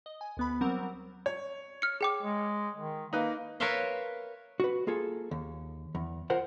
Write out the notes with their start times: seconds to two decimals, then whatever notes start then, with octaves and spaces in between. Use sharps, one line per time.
0.06 D#5
0.21 G#5
0.37 D2 B3 B5
0.61 F#3 G3 C4 A#4 F#5
1.26 C#5
1.82 F6 C#7
2.01 G#4 G5 D6
2.23 G#3
2.77 D#3
3.13 A#3 D#4 B4
3.60 A#4 B4 C#5 E5 F5 C6
4.60 F#4 B4
4.87 A#3 F4 G#4 A4
5.31 D#2
5.95 E2
6.30 F4 A#4 C5 F#5